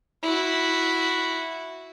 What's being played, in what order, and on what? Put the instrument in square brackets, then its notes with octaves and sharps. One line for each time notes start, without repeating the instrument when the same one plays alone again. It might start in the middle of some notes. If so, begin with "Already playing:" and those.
[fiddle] E4 F#4